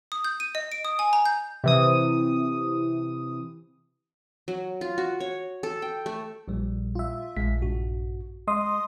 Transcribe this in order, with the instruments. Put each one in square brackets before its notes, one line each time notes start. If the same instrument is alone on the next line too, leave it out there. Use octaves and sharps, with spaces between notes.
[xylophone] D#6
G6
D#7
D#5
D7
D#6
G#5
A#5
G6
[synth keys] C3 E3 D#6
[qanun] F#3
F4
F#4
C#5
A4
G5
A3
[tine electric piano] A#1 A#2 G3
[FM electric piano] F4 E5
[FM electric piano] A#1 [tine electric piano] G#3 B6
[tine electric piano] G2 F#4
[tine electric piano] G#3 [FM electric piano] D#5 C6 D#6